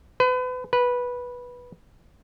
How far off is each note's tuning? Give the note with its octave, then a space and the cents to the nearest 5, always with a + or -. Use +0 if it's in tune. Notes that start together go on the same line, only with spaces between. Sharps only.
B4 +35
B4 -10